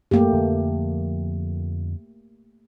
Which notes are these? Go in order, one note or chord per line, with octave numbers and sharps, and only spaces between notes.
F#2 A3 A#3 G4
F2 D3 F3